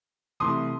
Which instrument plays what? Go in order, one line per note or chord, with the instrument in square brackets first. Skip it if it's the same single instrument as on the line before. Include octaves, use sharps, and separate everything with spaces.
[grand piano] C2 C3 E3 A3 C6 D#6